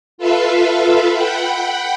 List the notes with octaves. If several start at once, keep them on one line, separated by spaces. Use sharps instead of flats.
F4 A4 B4 E5 F5
F#5 G5 B5